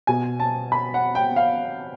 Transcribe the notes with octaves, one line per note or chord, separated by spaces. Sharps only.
B2 G#5
A5
B5
F#5
G5
F5